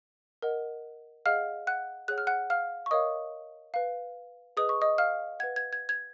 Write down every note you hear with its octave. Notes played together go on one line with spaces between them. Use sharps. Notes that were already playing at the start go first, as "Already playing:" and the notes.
A#4 D#5 F#5
G#4 D#5 F5 F#5 F6
F#5 F#6
G#4 C#5 F#5 F#6
F6
F#5 F#6
F5 F6
C#6
A#4 C#5 D#5 F5 D#6
B4 F5
G#4 B4 D#5 D#6
C#6
D#5 D#6
F5 F6
B4 F#5 G#6
G#6
G#6
G#6